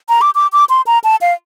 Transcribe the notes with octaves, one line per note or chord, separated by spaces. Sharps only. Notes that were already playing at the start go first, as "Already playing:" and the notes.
A#5
D6
D6
D6
C6
A#5
A5
F5